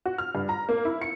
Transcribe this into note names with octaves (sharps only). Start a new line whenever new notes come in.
F#4
F6
G2
A#5
A#3
E4
C#7